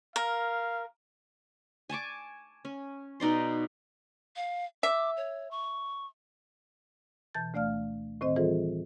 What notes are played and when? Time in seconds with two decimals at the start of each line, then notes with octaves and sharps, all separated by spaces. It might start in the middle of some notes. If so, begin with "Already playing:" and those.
0.16 A#4 F5
1.90 G#5 A5 C#6 D6
2.65 C#4
3.20 B2 D#4 D5 C6
4.36 F5
4.83 E5 D6
5.17 C#5
5.51 C#6
7.35 B2 E3 A5 G6 A6
7.54 D2 A3 D5 F5 F6
8.21 A2 D#3 C4 C5 D#5
8.36 E3 G3 F4 G#4 A4 C5